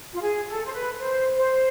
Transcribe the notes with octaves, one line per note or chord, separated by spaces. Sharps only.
F4
G#4
A4
C5
B4
C5
C5